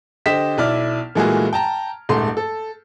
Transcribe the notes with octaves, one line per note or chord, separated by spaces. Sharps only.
D3 G4 C5 D#5 B6 E7
B1 E4 D5 F6
A#2 E3 G#3 A3 F#4 G#4
G5 A5 A#5
D#1 G#2 A3 C6
A4